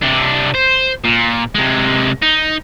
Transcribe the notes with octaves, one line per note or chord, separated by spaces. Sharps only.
C3 D4
C5
A#2
C3 G#3
D#4